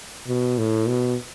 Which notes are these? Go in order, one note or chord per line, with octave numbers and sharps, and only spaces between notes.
B2
A2
B2